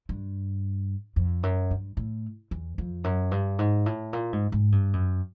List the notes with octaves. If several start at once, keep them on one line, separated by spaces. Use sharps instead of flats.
G2
F2
F#2
G2
A2
E2
F2
F#2
G2
G#2
A2
A#2
G#2
G#2
G2
F#2